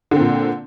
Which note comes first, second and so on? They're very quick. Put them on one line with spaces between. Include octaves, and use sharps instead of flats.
D3 C4 A#2